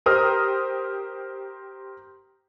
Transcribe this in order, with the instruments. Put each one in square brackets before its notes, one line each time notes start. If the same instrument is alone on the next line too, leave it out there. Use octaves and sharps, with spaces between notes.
[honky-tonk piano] G4 A#4 C5 A#5 D#6 F6